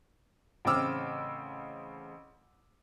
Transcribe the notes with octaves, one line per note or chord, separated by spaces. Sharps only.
A1 C#3 C4 D6 E6 F6